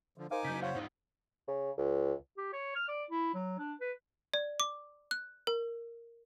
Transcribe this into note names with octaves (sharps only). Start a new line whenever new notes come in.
D3 F3
D#4 A#4 C5 F5 G#5 D6
C#3 F#3 G6 B6
C5 C#5 F5 F#5
G#2 D#4 F4
C#3
C#2
G4
C#5
F6
D5
E4
F#3
D4
B4
D5
D6
F#6
A#4